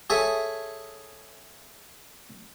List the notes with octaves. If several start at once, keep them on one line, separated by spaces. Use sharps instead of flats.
G#4 A4 C#5 E5 G#5